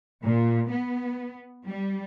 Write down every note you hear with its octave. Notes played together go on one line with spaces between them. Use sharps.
A#2
B3
G3